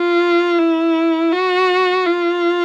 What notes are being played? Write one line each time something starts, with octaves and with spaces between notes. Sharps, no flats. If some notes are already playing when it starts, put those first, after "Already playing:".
Already playing: F4
E4
F#4
F4